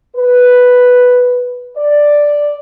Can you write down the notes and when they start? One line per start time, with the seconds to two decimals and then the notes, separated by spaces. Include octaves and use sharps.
0.15 B4
1.76 D5